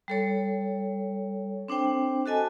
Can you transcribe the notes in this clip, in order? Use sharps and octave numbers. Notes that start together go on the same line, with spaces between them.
G3 A4 C#5
C4 D4 C5 G5
F#4 A4 D#5 G#5 A5